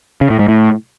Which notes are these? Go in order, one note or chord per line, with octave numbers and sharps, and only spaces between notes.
C#3
A2
G#2
A2